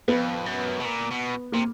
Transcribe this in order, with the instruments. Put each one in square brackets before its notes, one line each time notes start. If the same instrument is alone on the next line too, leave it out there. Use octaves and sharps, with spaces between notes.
[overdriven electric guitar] F2 [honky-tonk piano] B3
[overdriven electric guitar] F#2
B2
A#2
B2
[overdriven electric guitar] C3 [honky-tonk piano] A#3